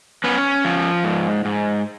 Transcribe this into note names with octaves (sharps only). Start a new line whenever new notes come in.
B3 C#4 B4
F3
G#2
G#2